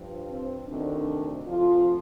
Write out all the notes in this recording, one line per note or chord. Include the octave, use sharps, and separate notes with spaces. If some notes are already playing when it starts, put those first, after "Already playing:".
Already playing: G2 F3
C4
D2 C3 D#3 D4
D2 C3 F3 F4